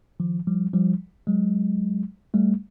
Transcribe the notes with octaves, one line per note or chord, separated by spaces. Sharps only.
D#3 F3
F3 G3
F3 G3
F#3 G#3
G3 A3